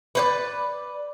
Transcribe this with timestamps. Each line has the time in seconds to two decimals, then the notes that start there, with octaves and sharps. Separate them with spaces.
0.15 B4 C5 D5